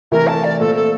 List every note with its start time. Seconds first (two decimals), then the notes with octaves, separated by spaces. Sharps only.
0.11 C3 E3 A3 E4 A#4
0.27 A5
0.43 D5
0.60 A#2 A3 C4 F4 A4
0.75 A4